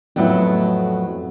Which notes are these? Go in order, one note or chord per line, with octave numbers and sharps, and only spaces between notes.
F2 A2 F#3 B3 E4 E5